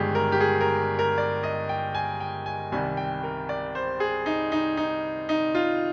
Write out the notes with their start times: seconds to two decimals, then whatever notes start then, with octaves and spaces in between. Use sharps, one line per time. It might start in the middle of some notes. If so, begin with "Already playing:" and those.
Already playing: G1 G2 D#3 G#3 G4 G#4
0.15 A#4
0.32 G4
0.40 G#4
0.61 A#4
0.99 A#4
1.18 D5
1.43 D#5
1.69 G5
1.94 G#5
2.20 G5
2.46 G#5
2.72 C2 C3 D#3 G3 G#5
2.97 G5
3.23 A#4
3.49 D5
3.75 C5
4.00 G#4
4.26 D#4
4.52 D#4
4.77 D#4
5.29 D#4
5.55 F4